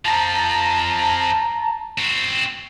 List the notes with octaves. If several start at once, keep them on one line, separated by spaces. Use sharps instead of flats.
F2 F3 A5 A#5
C4 F#4